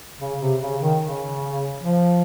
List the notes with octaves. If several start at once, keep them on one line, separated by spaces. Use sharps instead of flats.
C#3
C3
C#3
D#3
C#3
F3